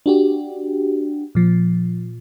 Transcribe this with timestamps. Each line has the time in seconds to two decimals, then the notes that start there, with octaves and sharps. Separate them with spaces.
0.06 D4 F#4 G4
1.35 A#2 F3